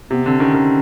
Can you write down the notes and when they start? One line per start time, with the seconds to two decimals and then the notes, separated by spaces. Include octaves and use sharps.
0.11 C3 B3
0.26 D3 C4
0.40 D#3 C#4
0.54 D#3